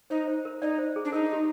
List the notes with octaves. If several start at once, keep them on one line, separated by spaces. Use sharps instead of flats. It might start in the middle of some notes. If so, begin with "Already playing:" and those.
D#4 C5
C5
A#4
D#4 D5
C5
G#4
D4
D#4 A#4
G4